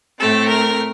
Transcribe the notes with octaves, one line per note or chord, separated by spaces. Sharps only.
A2 A3 C4 A4
A#4